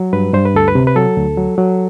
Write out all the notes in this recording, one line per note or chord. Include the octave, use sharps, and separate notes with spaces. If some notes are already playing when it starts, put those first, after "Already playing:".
Already playing: F#3
G2 B4
G2 C5
B4
D2 A4
B4
C3
B4
F#3 A4
D2
F#3
F#3